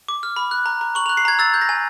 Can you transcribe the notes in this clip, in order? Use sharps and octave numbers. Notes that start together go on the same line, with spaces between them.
D6
F6
B5
F#6
A#5
A#5
C#6 F#7
F7
F#6
C7
A#5 G#6
E6 A6
G6
A#6
G#5